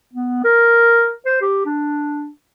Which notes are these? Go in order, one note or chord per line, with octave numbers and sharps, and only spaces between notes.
B3
A#4
C5
G4
D4